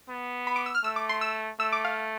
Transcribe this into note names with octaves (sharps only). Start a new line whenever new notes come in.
B3
B5
D6
E6
F6
A3 E6
D6
C6
E6
A3 E6
D6
F5